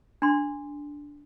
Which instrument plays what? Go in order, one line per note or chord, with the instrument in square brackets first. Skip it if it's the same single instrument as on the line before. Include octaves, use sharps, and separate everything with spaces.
[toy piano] D4 C6